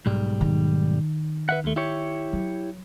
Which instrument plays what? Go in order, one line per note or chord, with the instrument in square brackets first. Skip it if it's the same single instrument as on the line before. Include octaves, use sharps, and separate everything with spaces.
[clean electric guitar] B1 G#2 G3
[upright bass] D#3
[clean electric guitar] B4 E5 F#5
D#2 A3
E4 G4 C#5
[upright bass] F#3